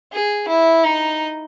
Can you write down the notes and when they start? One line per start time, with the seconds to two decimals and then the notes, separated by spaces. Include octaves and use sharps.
0.12 G#4
0.48 E4
0.85 D#4